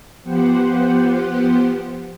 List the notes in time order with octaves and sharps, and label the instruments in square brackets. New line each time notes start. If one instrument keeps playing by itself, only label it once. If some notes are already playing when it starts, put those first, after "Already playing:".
[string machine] F3 B3 G4 C5 F#5